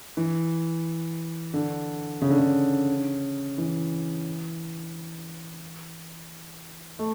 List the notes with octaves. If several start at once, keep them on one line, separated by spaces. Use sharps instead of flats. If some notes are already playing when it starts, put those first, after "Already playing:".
E3
D3
C#3
D3
C#3
E3
A3